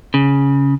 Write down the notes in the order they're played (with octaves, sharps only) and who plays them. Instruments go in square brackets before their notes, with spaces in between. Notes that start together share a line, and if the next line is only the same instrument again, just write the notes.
[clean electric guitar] C#3